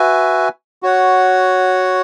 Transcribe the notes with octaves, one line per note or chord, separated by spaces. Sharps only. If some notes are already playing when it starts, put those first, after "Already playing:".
Already playing: F#4 B4 E5 G#5
F#4 C#5 F#5